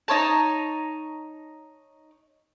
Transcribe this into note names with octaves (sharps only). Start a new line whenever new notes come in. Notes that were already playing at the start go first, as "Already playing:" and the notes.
D#4 C#5 A5